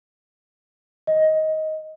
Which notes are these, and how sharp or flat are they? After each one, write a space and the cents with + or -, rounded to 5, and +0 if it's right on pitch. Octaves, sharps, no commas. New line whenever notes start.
D#5 +15